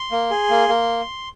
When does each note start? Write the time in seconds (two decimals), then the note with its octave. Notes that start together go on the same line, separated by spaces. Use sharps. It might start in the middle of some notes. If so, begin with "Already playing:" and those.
Already playing: C6
0.11 A#3
0.31 G#4
0.50 A#3
0.69 A#3